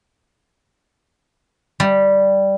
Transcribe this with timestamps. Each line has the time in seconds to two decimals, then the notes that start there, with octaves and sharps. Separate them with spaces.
1.80 G3